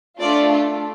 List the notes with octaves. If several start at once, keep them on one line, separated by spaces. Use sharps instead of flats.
A3 D4 F4 A4 D5